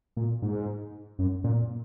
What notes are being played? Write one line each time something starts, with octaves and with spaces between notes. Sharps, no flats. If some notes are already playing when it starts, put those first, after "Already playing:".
A#2
G#2
F#2
A#2